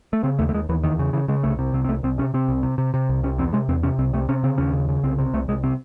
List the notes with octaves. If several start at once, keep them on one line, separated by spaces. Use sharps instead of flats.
A3
C#3 C4
D#2 A3
A3
D#2 G#3
D#2 E3
E2 D#3
C#3
C#3 E3
C#3 G#3
C2 A3
C3
C2 C4
C4
C2 A3
C2 C4
C3 C#4
C3 C4
C2
C3
C3
C3
C2
C3 C#4
E2 C4
C3 G#3
E2 C4
C3 C#4
C2 C4
C3 A3
C3 C#4
C#3 C4
D#2 C#4
C#3
C#3
C2 C4
C3
C2 A3
C2 G#3
C3 C4